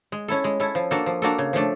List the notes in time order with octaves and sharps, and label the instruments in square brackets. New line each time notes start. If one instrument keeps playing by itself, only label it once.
[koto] G#3
C#4 E4 A4
G#3
C#4 E4 A4
F3
A#3 D4 F#4 A4
F3
A#3 D4 F#4 A4
C#3
F3 A3 D4